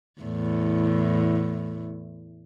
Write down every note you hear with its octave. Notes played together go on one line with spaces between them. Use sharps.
E2 A2